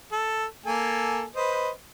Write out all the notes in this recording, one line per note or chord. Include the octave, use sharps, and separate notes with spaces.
A4
A#3 A4 G#5
B4 C5 D#5